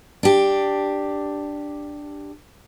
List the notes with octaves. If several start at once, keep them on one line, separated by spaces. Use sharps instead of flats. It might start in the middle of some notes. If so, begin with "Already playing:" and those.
D4 G4